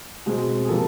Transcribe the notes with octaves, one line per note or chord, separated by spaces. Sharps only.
B2 G#3 C4
G#4
C3 F3 A#3 A4